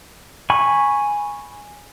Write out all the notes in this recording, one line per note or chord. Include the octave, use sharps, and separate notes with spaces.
G#5 B5 C#6